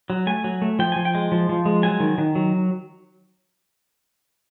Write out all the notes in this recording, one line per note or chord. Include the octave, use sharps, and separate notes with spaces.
F#3
A3 G#5
F#3
A3
F3 G5
F3 G#5
G5
G#3
F3
F3
G#3
F#3 G#5
D#3
D#3
F#3